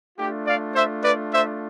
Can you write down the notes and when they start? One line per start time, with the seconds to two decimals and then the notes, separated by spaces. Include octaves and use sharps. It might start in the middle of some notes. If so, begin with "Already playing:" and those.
0.19 A3 D4 F4 G4
0.47 D5 F5
0.75 C5 E5
1.04 B4 D5
1.33 C5 E5